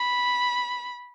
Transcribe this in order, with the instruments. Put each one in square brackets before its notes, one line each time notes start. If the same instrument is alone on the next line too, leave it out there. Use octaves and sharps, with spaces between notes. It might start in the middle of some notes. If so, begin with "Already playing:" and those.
Already playing: [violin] B5